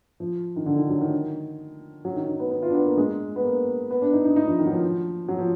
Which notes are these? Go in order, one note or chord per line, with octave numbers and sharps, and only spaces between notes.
F3
D#3
D3
D#3
F#3
D#3
F#3
D#3
D#3
B3
B3
F4
D4
B3
A#3
G#3
B3
A#3
B3
D4
D#4
D#4
D#4
F3
D#3
F#3
F3
F#3
F3